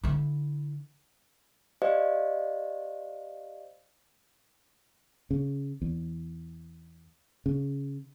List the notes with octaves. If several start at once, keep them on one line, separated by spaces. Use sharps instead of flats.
D3 E4
G4 C5 D5 D#5 F5
C#3
E2
C#3